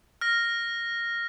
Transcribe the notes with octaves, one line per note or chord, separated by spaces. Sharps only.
F6 A#6